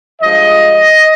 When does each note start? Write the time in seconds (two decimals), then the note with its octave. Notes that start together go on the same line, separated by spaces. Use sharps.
0.22 G2 F3 G#3 D#5